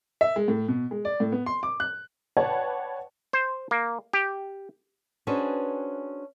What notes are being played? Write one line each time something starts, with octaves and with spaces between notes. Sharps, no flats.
E5
G#3
A2
B2
G#3
D5
A2
B3
C6
D6
F#6
B4 C#5 D5 F#5 G5 A5
C5
A#3
G4
C#4 D4 F#4 G#4 B4 C5